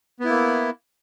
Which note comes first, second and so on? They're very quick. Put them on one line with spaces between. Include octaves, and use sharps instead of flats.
B3 E4 A#3